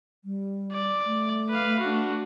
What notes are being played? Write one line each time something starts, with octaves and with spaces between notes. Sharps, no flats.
G3
D5
A3
B4 F5
D4 F#4